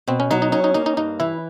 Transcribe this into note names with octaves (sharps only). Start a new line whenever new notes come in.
B2 C4
C#4
F#3 D#4
D#4
C#4 D#4
D#4
A#3 D#4
D#4
G2 D#4
E3 E4